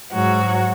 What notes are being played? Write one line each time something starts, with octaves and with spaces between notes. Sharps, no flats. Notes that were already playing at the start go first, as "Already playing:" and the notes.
G#2 F#3 F#4